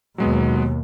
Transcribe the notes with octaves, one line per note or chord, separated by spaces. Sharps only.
D#2 B2 F#3 G#3 B3